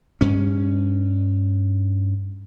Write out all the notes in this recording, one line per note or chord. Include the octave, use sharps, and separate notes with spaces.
G2 C#4